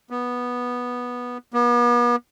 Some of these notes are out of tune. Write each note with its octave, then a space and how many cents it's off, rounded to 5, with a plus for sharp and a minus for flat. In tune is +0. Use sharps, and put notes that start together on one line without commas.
B3 -10
B3 -40